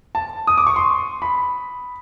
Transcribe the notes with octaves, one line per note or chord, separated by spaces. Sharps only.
A5
D#6
D6
C#6
C6
B5